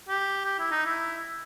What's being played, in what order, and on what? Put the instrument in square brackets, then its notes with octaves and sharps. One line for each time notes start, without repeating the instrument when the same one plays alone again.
[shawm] G4
G4
E4
D#4
E4